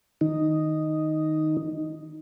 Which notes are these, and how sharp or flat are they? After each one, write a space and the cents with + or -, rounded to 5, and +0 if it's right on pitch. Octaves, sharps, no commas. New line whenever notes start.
D#3 +0 D#4 +0